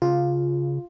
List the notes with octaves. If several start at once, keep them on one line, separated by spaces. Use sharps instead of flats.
C#3 F4